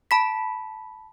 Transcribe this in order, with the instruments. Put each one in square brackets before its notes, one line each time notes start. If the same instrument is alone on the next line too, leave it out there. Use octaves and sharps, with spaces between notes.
[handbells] A5 B5 B6